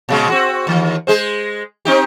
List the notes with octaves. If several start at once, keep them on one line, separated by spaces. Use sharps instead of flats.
A#2 C#3 G#3
C4 F#4
D#2 E3
G#3 G#4 C5
C4 D#4 G4